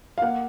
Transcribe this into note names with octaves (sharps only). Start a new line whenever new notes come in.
F5
A#3 F#5